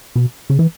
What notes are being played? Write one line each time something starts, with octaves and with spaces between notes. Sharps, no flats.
B2
C#3
E3